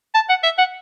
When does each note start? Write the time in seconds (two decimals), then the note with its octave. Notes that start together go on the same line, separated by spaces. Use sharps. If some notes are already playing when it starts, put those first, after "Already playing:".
0.15 A5
0.29 F#5
0.43 E5
0.58 F#5